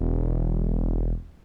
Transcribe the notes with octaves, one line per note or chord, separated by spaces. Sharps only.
E1